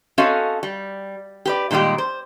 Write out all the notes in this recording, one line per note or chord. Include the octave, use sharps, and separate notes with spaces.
C4 C#4 F#4 A4 D#5 F5
G3
G4 B4 D5
A#2 D#3 G3 G#3 G4
C5